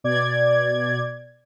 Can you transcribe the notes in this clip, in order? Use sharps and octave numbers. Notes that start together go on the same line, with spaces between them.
B2 D5 G#6